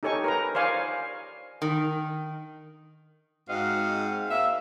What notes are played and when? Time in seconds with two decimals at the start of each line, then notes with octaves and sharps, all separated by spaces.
0.03 D#4 G4 A4 C#5 G#5 C#6
0.24 A#4 B4 A#5
0.55 C5 D5 F5 G#5 C#6
1.62 D#3
3.48 G#2 C4 F#4 D#5 F5
4.30 A#3 E5